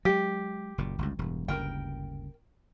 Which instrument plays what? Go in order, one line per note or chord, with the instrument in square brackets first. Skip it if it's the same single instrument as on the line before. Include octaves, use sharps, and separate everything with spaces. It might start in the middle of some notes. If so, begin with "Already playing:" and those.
[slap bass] F#3 G#3 [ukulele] G4
[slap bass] F#1 A#2
G1 C#2
E1 G2
[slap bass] F#1 D2 G2 [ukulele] A#4 G5